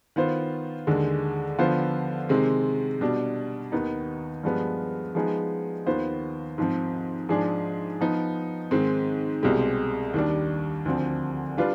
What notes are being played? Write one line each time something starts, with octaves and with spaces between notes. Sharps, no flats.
D#3 B3 F4 C5
D#2 D3 G#3
D3 F3 B3 F4 C5
C3 D#3 G#3 C4
B2 G3 D4
D#2 D#3 B3 D#4
G2 F3 G#3 B3
F3 G#3 B3 D#4 G#4
D#2 D#3 B3 F4 C5
G#2 F3 C4
G#2 F3 G#3 D4 G#4
F3 B3 D#4
G#2 D#3 G#3 C4
C2 B2 G#3 C4 G4
D#2 D#3 G3 D4
D2 D3 F3 C4
G3 D4 F4 B4